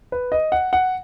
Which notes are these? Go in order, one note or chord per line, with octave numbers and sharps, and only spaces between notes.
B4
D#5
F#5
F#5